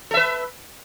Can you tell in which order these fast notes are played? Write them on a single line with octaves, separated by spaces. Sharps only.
A4 E5 B4